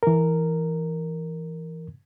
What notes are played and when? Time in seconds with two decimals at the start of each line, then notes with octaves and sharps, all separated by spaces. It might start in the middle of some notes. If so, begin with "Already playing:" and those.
0.03 E3 A#4